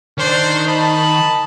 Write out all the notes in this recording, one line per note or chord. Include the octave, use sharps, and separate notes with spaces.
D#3 D4 C5
D#5 A5 B5